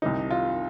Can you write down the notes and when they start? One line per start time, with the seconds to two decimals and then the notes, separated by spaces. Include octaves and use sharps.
0.02 C2 C3 D#3 D#4
0.31 F4